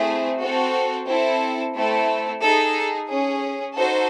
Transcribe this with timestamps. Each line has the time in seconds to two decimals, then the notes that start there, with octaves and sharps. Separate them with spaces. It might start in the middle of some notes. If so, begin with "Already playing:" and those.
Already playing: A3 C4 E4 G#4
0.40 C4 F#4 A4
1.07 C4 E4 A4
1.74 A3 C4 E4 A4
2.41 D#4 G#4 A4
3.08 C#4 G#4
3.75 D#4 F#4 A4 C5